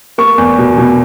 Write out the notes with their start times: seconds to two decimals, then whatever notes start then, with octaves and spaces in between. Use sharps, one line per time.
0.18 A#3 C#6
0.38 E2
0.58 B2
0.78 B2